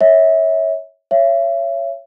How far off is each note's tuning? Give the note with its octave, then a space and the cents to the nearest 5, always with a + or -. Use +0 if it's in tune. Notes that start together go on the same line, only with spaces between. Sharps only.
C#5 +0 E5 -25
C#5 +0 E5 +35